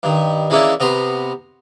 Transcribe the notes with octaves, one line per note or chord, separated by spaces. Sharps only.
G2 D#3
E3 G#3 A#3 C#4 D4 E4
C3 B3 A#5 C6